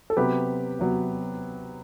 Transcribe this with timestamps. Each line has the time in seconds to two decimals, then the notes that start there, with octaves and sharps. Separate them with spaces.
0.10 A4
0.17 C3 F#3 B3 G4 B4
0.79 C3 F#3 B3